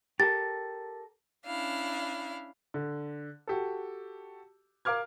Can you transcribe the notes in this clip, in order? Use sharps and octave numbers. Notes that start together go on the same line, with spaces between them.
G4 A4 A#4 A6
C#4 D4 E4 F5
D3
F#4 G4 A4
A#4 F5 D6 F6 G#6